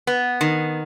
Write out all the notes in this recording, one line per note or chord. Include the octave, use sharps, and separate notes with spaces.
B3
D#3